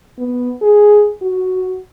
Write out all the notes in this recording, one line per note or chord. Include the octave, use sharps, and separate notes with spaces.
B3
G#4
F#4